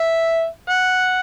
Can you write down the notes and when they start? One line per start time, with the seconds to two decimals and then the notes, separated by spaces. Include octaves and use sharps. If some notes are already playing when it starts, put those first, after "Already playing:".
Already playing: E5
0.69 F#5